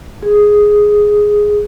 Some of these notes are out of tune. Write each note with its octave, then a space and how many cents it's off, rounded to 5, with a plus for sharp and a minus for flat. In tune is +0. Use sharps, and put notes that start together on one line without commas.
G#4 +0